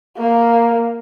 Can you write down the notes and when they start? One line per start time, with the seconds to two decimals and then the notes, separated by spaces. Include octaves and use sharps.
0.17 A#3